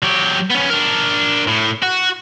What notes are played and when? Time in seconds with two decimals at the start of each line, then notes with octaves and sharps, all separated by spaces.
0.03 F#3 G4
0.50 B3 C#4
0.69 D4 A#4
1.47 A2
1.83 F#4